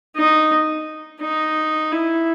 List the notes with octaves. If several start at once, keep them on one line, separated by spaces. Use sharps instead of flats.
D#4
D#4
E4